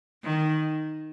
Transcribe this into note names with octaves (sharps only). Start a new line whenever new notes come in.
D#3